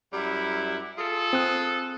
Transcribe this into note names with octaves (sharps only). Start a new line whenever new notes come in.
F#2 G3 E4
F4 G#4 A4
C4 D#6 F#6